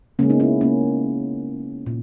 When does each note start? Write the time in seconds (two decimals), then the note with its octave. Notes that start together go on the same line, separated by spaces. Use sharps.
0.19 C#3 G#3 A#3 C#4
0.30 B3 D#4
0.40 C#4 E4
0.61 A#3 C#4
1.86 A#2